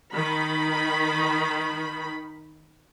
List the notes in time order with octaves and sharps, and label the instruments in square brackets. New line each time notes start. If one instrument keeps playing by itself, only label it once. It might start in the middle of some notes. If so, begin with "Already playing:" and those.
[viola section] D#3 B5